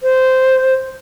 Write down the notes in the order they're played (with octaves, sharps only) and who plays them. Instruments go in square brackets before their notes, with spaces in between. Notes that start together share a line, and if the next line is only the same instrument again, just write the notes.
[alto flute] C5